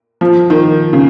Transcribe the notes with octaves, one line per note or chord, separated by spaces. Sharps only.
F3
D#3
C#3